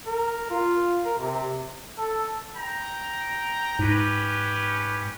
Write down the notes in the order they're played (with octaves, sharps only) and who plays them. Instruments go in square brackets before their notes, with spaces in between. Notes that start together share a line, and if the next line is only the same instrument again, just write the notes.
[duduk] A#4
F4
A#4
C3
[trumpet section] A4
G5 A#5
[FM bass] G#2 [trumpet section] C#4 G4 B4